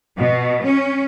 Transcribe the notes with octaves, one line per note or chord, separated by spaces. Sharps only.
B2
C#4